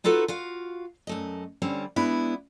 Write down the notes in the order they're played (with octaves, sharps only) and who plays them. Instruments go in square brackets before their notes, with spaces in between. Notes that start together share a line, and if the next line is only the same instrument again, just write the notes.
[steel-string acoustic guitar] D#4 F4 F#4 A4 B4
F4 F#4 F5
F#2 A3 D#5
D3 G3 C4 C#4
G#3 B3 D4 E4